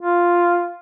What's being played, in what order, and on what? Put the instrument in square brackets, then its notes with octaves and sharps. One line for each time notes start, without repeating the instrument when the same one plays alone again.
[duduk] F4